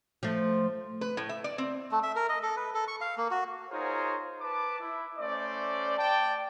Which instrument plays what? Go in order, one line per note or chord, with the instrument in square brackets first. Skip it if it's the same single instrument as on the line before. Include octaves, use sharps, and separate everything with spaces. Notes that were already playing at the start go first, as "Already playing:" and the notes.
[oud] F3 A3
[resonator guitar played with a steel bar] B4
A2
E5
D5
C4
[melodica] A3
E5
A#4
D#5
A4
B4
A4
C#6
F5
A#3
F#4
[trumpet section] D#4 F4 G#4 A#4 C5 C#5
B4 A5 D6
E4
A3 C#4 C5 D5
D5 G5 A5